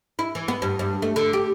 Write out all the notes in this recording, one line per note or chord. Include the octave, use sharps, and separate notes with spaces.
E4
E3
B3
G2
G2
A3
D3
G4